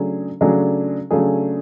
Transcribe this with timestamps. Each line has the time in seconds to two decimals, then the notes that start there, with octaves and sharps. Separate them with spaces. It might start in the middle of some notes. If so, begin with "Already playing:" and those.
Already playing: C#3 F#3 A3 D4 G#4
0.41 C#3 F#3 A3 D4 G#4
1.11 C#3 F#3 A3 D4 G#4